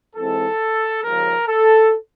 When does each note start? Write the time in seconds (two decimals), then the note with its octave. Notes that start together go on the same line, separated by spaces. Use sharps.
0.16 G#2 E3 G#3 C4 A4
1.03 D#2 C#3 F3 G#3 A#4
1.48 A4